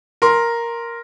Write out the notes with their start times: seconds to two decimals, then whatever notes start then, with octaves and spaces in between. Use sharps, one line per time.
0.22 A#4 C6